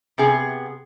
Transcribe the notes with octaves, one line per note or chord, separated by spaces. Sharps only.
C3 B3 G#4